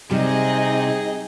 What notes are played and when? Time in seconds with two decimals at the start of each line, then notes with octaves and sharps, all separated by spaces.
0.11 C3 G3 C4 D#4 G#4 D#5